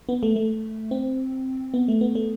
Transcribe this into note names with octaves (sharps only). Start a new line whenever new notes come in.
B3
A3
A3
C4
B3
A3
B3
A3